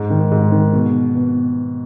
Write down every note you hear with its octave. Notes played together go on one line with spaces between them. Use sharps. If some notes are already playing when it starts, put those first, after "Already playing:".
Already playing: G#2
D#3
G#2
D#3
B2
B2